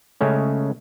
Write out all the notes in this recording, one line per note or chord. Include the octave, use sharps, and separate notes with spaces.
C#3 G#3 A3 C#4